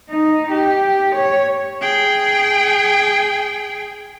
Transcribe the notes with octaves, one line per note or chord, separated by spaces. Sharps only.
D#4
G4
C#5
G#4 G5